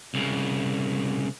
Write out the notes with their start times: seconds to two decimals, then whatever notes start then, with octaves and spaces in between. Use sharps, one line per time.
0.14 C2 C#3